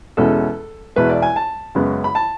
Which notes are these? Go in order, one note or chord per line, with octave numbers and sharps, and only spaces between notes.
E2 B2 G#3 C#4 A4
E2 B2 G#3 B4
D5
G#5
A5
F#2 C#3 G#3 B3
B5
A5